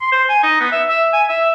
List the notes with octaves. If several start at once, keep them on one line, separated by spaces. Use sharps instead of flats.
C6
C5
G#5
D#4
B3
E5
E5
G#5
E5